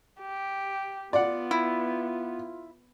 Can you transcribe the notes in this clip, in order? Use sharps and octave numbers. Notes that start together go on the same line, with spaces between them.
G4
B3 F4 D5 F#5
E4